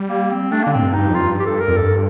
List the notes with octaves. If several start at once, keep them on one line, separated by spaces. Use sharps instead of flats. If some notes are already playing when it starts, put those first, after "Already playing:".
Already playing: G3
A#3
C4
A3 D4
D3 A#3
A2 C4
G2
D#4
G2
F2 F4
G2
G4
A4
A#4
F2
G2 A4